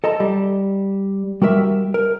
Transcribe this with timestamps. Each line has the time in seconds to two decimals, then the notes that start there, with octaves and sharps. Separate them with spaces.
0.04 A4 D#5 A5 A#5
0.20 G3
1.42 G3 F#4 A#4 E5
1.94 A#4